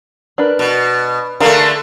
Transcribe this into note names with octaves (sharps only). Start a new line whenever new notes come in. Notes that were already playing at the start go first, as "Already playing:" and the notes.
D4 A#4 B4
B2
D3 A3 G#4 A#4 F5